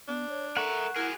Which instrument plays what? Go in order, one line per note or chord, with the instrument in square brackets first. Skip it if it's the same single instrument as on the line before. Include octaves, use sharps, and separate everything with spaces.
[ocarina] B3 [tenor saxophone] D4
[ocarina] C#5
[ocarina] A4 [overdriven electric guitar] A#4 E5 [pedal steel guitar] F#5 C#6
[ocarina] E4 [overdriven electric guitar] F#4 G#4 [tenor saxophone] A#4